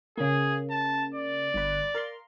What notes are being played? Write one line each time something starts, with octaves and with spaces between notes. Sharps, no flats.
C#3 A#3 G#4
A5
D5
G1 B4
A#4 F5 C6